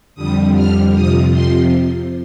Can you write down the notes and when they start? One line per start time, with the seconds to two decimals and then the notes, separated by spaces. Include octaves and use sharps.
0.15 F2 D3 G3 D#6
0.54 F6
0.94 F2 C3 F3 D#6
1.31 C6